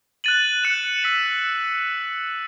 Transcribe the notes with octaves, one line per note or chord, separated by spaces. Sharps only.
F#6 A6 D#7 F#7
F#6 C#7 E7
E6 B6 E7